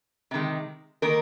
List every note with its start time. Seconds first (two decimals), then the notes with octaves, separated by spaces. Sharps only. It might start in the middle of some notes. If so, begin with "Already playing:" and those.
0.31 C3 D#3 G#3
1.02 D#3 A#3 A#4